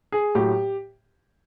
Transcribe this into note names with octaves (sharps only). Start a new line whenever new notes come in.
G#4
A2 F#3 G4